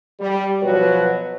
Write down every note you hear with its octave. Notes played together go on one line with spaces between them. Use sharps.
G3
B2 F3 F#3 F#4 B4 C#5